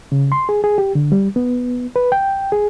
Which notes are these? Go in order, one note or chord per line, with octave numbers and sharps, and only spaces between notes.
C#3
C6
G#4
G#4
G4
D3
G3
B3
B4
G5
G#4